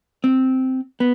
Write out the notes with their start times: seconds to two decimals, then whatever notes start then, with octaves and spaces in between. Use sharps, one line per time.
0.24 C4
1.00 B3